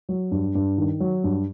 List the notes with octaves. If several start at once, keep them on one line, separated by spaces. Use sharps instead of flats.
F#3
G2
G2
D#3
F#3
G2